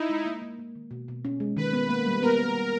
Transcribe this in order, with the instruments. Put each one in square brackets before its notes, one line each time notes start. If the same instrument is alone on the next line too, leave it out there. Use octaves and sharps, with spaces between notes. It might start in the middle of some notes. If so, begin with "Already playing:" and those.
Already playing: [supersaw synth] D#4 E4
[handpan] G#3
A#3
A#3
A#3
D#3
B2
B2
C#4
G#3
[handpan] D#3 [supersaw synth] B4
[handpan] B3
[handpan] A#3 [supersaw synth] B4
[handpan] G3
[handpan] B3 [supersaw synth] A#4
[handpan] B3
G3